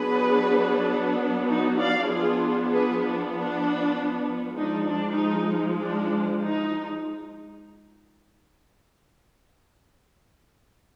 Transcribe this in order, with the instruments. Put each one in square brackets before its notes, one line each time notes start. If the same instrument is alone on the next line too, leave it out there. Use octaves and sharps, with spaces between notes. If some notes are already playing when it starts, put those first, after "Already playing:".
Already playing: [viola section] F#3 B3 D4 G#4 B4
D#4 F#4
D5 F5
F3 B3 D4 F4 G#4
G#4 B4
D4
D4
F3 G#3 D4 D#4
D4
D#4
D4
D#4